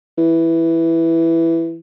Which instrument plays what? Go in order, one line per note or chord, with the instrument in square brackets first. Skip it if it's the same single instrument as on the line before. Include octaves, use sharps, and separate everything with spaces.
[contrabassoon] E3